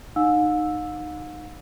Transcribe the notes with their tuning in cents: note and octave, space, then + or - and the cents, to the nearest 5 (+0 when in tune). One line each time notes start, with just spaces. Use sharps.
D#4 -20 F5 +45 E6 +0